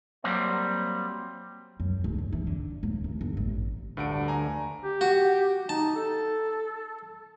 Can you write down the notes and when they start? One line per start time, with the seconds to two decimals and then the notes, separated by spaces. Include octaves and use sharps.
0.24 F#3 G3 A#3 C4
1.80 F#2
2.04 D1
2.18 G#1
2.33 E3
2.47 D3
2.83 D1
3.04 D#2
3.21 G1
3.37 A1
3.97 D2 G2 F#5 D7
4.28 G#5 A#5
4.84 G4
5.01 F#4
5.69 D#4 A5
5.96 A4